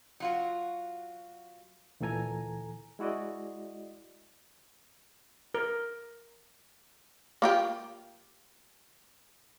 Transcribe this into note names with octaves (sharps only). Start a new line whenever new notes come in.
F#3 F4 F#4
D2 A#2 E3 A4 G#5 A#5
G#3 E4 F#4 D5 D#5
A#4
A#3 F4 G4